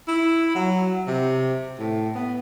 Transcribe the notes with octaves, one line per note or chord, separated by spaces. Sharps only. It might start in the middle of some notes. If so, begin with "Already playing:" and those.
E4
F#3
C3
A2
B3